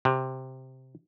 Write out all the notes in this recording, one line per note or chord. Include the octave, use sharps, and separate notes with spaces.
C3